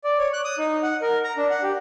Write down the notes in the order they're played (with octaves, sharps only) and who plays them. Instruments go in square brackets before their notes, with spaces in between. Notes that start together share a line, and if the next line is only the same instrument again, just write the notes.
[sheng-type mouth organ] D5
C#5
F#6
D#6
D#4
F#5
A#4
A#5
D4
F#5
G4